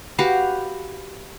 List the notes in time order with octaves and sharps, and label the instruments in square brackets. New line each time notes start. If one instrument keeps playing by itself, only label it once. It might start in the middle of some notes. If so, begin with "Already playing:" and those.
[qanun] F#4 G4 B4 F5